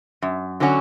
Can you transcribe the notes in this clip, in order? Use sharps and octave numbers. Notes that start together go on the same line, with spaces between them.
F#2
D3 F#3 C#4 F#4